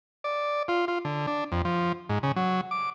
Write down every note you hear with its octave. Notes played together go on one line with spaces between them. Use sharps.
D5
F4
F4
D3
D4
F2
F3
G#2
C#3
F#3
D6